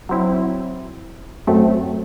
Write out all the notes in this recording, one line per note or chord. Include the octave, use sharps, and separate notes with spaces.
F#3 C4 E4
F#2 F#3 A3 C4